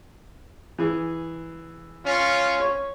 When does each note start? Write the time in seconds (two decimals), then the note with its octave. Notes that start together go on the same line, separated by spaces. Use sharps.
0.79 E3 G#4
2.04 C#4 F4
2.60 C#5